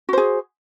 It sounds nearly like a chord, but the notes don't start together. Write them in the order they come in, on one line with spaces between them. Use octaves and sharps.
F#4 C5 G#4